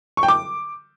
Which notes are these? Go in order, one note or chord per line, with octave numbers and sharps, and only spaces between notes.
C#6
G5
D6